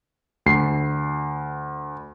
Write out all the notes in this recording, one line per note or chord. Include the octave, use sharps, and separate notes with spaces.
D2 C7